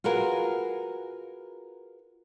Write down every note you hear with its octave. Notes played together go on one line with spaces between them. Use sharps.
F4 F#4 G#4 A#4 B4